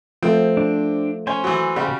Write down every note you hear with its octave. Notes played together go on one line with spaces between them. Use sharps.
F3 A3 C4
D4
C#4 C5 G#5
E3 F#3
C#3 G3 F#4